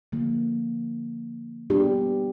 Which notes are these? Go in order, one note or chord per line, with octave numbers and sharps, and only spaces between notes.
D3 F3 A#3
G3 B3 D4 G4